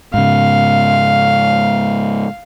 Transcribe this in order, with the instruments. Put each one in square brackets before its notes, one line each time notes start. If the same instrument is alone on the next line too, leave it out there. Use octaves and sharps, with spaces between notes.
[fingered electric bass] G#2 C#3 [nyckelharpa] F5